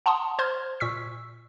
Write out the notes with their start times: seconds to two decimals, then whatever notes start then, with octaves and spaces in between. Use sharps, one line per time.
0.06 F#5 A5 A#5 C6 D#6
0.39 C5 C6 F6 G#6
0.80 A#2 C#6 E6 B6